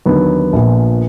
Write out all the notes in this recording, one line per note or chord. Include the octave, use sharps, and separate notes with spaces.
D#2 D3 F#3 B3
A#1 A#2 F3